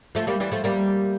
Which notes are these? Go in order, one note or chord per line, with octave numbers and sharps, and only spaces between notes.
F3 A3
G3 A#3
E3 G3
F3 A3
G3 A#3